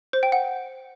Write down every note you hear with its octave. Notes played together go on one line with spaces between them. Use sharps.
C5
G5
F#5